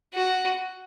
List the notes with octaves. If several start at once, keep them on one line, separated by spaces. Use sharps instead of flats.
F#4